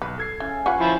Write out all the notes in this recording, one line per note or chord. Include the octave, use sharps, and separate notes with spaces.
B1 B4
A4 G#6 C7
C#3 E3
F4 B4 F#5 C#6
F3 E4 C6